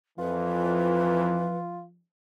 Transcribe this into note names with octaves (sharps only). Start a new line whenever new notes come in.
F2 E3 F3 F4 B4